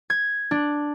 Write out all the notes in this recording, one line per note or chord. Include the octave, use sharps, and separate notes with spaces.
G#6
D4